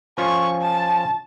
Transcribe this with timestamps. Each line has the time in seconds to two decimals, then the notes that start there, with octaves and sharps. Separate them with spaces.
0.18 F3 C#4 F4 C#6
0.61 A5